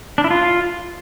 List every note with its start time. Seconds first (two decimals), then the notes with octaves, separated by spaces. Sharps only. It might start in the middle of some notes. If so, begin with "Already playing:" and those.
0.18 D4
0.24 E4
0.31 F4